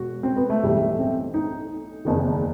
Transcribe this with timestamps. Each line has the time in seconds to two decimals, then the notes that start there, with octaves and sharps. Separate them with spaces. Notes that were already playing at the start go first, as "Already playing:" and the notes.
Already playing: E1 F#4
0.23 C4
0.37 B3
0.50 A3
0.63 B1 A2 E3 G3
0.81 A3
0.99 C4
1.34 D#4
2.05 F#1 E2 D#3